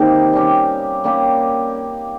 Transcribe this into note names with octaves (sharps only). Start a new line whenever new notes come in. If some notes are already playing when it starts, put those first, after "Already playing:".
Already playing: C3 D#3 A#3 D#4
G3 C#4 G4
G3 A#3 C#4 G4